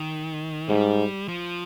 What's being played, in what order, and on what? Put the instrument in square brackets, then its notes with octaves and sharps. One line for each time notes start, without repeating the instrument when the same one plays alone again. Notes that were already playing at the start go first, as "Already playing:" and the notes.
Already playing: [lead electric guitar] D#3
[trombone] G#2 [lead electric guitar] G3
[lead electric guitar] F3